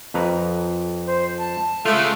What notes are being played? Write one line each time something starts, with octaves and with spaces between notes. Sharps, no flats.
F2 B4 A#5
C5
A5
G#3 A3 F4